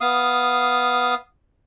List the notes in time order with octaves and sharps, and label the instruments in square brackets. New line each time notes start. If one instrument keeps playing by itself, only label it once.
[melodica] B3 F5 D#6